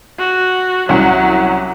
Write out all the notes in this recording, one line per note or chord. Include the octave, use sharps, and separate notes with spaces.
F#4
C2 F#3 C#4 F#5